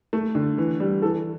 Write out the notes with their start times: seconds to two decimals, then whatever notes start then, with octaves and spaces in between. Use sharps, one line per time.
0.13 A3
0.35 D3
0.58 E3
0.80 G3
1.02 E3 A4